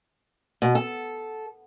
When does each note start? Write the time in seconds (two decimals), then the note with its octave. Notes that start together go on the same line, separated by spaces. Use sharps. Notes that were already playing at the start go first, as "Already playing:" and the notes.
0.62 B2
0.75 A4